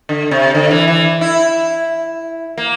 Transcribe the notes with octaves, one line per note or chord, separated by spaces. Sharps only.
D3
C3
D3
E3
E3
E4
A#3